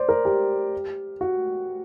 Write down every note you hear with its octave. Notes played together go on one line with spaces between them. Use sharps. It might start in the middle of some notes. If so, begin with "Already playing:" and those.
Already playing: C5 D5
A#4
G4
F#4